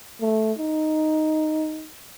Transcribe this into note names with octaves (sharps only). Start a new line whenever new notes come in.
A3
D#4